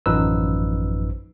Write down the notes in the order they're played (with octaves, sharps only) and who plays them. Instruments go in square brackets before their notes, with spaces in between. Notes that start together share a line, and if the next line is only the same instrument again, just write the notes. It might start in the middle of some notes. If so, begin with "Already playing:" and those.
[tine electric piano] A1 F#2 F3 D#4 B4 E6